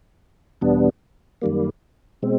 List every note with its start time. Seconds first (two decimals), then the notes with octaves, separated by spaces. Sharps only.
0.61 E2 B2 G3 B3 D4
1.42 F#2 D#3 G3 A#3
2.23 B2 G#3 C4